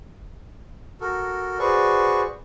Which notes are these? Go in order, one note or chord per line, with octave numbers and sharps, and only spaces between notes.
F#4 A4 A#4
F#4 G#4 B4 C5 D5 C#6